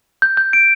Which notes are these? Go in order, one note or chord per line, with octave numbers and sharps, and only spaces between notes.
G6
G6
D7